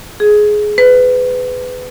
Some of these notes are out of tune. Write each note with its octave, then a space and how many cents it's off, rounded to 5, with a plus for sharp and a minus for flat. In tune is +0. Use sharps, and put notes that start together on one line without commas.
G#4 +15
B4 +25